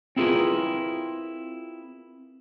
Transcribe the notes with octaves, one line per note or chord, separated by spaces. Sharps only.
C4 E4 F4 G#4 A#4 B4